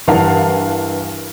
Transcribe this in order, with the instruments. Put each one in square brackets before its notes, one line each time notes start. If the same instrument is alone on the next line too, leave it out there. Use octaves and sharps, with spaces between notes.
[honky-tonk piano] G2 E3 A#4 F5 F#5 A5